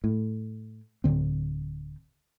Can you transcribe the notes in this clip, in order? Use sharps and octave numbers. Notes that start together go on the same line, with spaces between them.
A2
D1 D#2 D3 C4